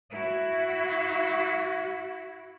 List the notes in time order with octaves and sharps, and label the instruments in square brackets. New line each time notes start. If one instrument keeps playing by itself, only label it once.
[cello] E4 F#4